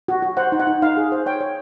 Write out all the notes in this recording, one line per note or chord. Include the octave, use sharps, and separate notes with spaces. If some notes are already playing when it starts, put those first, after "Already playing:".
F#4
F#4
C5 F#5
D#4
F#5
D#4
D#4 F5
G#4
C5
C#5 G5
C#5